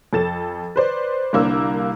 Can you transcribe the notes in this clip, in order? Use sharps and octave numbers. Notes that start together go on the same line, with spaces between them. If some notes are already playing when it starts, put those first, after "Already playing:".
F2 A4 A6 E7
B4 C5 D5
C2 D3 A#3 D6 E6